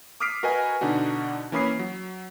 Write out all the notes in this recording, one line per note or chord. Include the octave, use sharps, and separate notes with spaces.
D6 D#6 F6 B6 C7 D7
F#4 A#4 B4 D#5 G#5
B2 D3 D4 D#4 F#4
E3 A#3 C#4 B5 D#6 C7
F#3